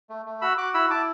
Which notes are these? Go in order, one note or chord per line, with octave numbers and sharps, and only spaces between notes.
A3
A3
F#4 B5 E6
F#4 D6 F#6
E4 B5 E6
E4 A5 D6